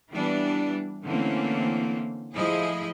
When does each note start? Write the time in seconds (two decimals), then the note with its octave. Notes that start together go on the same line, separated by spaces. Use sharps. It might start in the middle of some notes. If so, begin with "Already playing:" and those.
0.11 E3 G3 B3 D4
1.06 D3 E3 A3 A#3 C4 C#4
2.35 F3 A3 E4 G#4 D#5